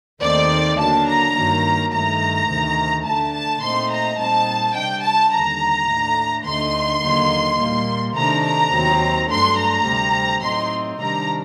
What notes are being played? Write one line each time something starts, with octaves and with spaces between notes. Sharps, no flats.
D#2 D#3 A3 C4 D#4 D5
D3 F#3 A#3 D4 A5
A#5
G2 D#3 F#3 A#3
G2 D#3 A3 A#5
D2 C3 D#3
D3 A3 D4 A5
A5
A#2 A3 C4 D#4 C6
A#5
A#2 G3 C4 D#4 A5
C3 G3 D4 G5
A5
D#2 D3 G3 A#5
A2 A3 D4
D2 D3 A3 D#4 C6
D#2 D3 F#3 A#3 D#4
A#2 G3 A#3
C3 D#3 A3 D4 A#5
A#5
D#2 D#3 F#3 C4
G2 F#3 A3 D4 C6
A#5
D2 C3 G3 C4
A2 F#3 C4 D#4 C6
C3 D#3 G3 D4 A#5